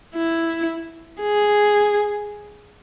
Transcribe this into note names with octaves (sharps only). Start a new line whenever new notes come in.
E4
G#4